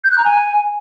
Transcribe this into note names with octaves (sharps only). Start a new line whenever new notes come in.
G6
F#6
A#5
G#5